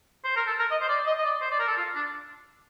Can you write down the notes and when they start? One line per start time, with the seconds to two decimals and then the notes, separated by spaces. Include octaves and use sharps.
0.24 C5
0.36 A#4
0.47 A4
0.59 A#4
0.71 D#5
0.81 C5
0.89 D5
1.06 D#5
1.18 D#5
1.25 D5
1.42 C5
1.51 D5
1.59 A#4
1.68 A4
1.77 F4
1.95 D4